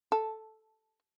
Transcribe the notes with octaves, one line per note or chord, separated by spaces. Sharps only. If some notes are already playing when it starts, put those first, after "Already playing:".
A4